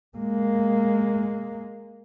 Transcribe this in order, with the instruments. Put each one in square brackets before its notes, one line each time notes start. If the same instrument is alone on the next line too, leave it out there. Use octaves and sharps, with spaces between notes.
[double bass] G#3 A#3